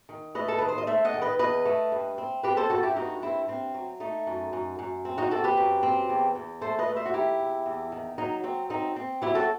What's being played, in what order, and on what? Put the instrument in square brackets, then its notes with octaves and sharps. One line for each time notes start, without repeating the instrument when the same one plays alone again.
[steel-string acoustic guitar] D#3
A3 B4 D#5
A4
D#3 B4
C5
D#5
A3 C5 E5
D#5 F#5
D#3
B4 D#5
E2 B4 D#5
A3
G2
C4
C4 G4 B4
A4 C5
G2 F#4 A4
E4 G4
G2 D#4 F#4
G2 C4 E4
G2 C4
F#3
A3 D#4
F#2
F#2
F#2
C4
D#4 F#4
C4 F#4 A4
G4 B4
F#2
C4
E2
E2
A3 A4 C5
B4 D#5
A3
C5 E5
F#4
D#3 E4 G4
E2
E2
D#3
F#3 D#4
F#3 C4
C4 D#4
C4
F#3 E4 G4
F#4 A4